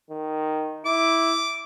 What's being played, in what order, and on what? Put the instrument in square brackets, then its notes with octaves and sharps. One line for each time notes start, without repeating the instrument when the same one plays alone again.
[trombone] D#3
[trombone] E4 [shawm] D6